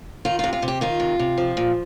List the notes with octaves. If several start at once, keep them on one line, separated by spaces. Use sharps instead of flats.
D#3 F4
C3 F4
F4
C3
G4
D#3 F4
C3
C3
F3
A#2